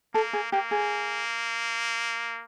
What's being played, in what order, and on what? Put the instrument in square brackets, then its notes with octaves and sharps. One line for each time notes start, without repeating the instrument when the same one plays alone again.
[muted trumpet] A#3 [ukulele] A4
[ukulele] G#4
[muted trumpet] A#3 [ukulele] G4
[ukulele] G#4